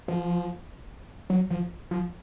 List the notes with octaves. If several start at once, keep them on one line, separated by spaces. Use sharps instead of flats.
F3
F#3
F3
F3